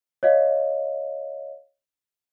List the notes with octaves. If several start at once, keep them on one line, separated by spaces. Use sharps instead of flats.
C#5 D#5 F5